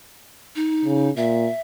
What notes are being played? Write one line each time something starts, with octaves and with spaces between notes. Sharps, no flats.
D#4
C#3
A#2 E5